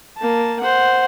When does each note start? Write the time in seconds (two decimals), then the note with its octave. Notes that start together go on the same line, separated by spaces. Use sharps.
0.17 A#3 A5
0.60 C5 F#5